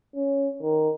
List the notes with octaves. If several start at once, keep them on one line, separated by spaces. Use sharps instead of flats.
C#4
D#3